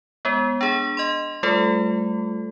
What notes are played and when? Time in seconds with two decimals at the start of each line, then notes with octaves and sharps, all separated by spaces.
0.25 G#3 B3
0.61 D4 G#4 A#6
0.97 D#5 C6
1.43 G3 A3 F4 A4